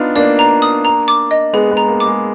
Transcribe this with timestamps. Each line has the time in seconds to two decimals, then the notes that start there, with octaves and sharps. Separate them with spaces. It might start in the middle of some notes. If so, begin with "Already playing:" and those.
Already playing: B3 D4 D#4 F4
0.16 A#3 D4 D5
0.39 A#5
0.62 D#6
0.85 A#5
1.08 D6
1.31 D#5
1.53 G#3 B3 G#4
1.71 G#3 B3
1.77 A#5
1.88 A#3
2.00 D6
2.06 G#3